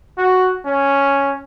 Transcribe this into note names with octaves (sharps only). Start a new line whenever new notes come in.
F#4
C#4